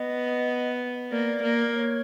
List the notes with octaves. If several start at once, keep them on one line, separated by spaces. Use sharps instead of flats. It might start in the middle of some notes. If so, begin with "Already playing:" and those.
Already playing: B3 D#5
A#3 D5
A#3
C#5